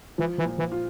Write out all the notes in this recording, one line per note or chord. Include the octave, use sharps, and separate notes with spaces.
E3 F3
E3
A#2
E3
F4